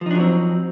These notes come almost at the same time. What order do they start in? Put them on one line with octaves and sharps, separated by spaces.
F3 D#4 D4 F#3 C4